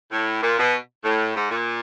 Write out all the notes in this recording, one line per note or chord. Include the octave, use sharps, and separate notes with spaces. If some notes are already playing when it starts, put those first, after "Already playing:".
A2
A#2
B2
A2
G#2
A#2